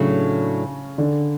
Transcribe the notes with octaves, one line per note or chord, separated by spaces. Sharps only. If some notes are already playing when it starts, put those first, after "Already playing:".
Already playing: A2 C#3 F#3 A3 D4 A4
D3